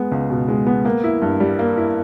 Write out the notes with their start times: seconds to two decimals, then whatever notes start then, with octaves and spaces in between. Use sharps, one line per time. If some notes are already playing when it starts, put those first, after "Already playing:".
Already playing: G#3 B3
0.12 C#2
0.30 B2
0.48 G#3
0.66 B3
0.85 A#3
1.04 E4
1.22 G2
1.40 G3
1.59 A#3
1.77 E4